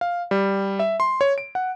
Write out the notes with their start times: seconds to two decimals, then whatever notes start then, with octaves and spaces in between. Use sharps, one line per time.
0.01 F5
0.31 G3
0.79 E5
1.00 C6
1.21 C#5
1.38 D7
1.55 F#5